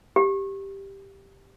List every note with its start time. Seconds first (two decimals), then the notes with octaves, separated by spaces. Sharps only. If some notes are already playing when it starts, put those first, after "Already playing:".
0.16 G4